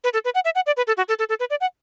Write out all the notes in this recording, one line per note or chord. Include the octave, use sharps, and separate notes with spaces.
B4
A4
B4
F#5
E5
F#5
D5
B4
A4
F#4
A4
A4
A4
B4
D5
F#5